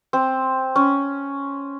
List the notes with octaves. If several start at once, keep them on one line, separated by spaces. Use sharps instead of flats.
C4
C#4